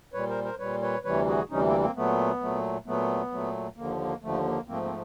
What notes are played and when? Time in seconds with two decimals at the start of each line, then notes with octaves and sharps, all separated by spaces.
0.14 A#2 G3 B4 C#5
0.29 A#4 C5
0.44 A#4 C5
0.59 A#2 G3 B4 C#5
0.82 B4 C#5
1.04 D2 C3 E3 G3 B4 C#5
1.27 F#4 G#4
1.50 D2 C3 E3 G3 C#4 D#4
1.66 A#3 C4
1.80 A#3 C4
1.95 A#2 F#3 A3 B3
2.41 A#2 F#3 A3
2.86 A#2 F#3 A3 B3
3.32 A#2 F#3 A3
3.77 D#2 D3 F3 A#3
4.00 A#3
4.22 D#2 D3 F3 A3
4.45 A#3
4.67 G#2 F3 A3 A#3 C4
4.83 A#3 C4